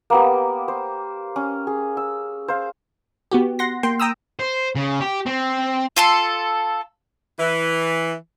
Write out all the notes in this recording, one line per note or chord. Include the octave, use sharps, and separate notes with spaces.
A#3 B3 G4
C5
C#4
G#4
E6
C5 F5
B3 F#4 G4
F#5 C6 A#6
A#3 G5 C6
G5 A#5 D#6 E6
C5
C#3
G4
C4
F4 A4 C6
E3